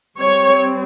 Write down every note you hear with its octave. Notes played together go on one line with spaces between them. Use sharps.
G3 C4 C#5